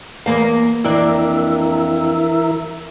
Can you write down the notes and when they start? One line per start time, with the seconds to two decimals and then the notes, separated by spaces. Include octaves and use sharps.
0.26 E2 A#3 F5
0.84 F2 E3 A#3 D4 A#4 E5